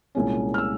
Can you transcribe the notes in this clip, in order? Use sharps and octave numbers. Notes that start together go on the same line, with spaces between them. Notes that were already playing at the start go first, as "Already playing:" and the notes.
C2 A#2 G#3 C#4
F6
E6